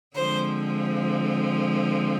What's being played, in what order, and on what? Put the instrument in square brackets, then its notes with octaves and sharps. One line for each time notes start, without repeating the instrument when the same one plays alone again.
[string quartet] D3 F3 G#3 C4 C5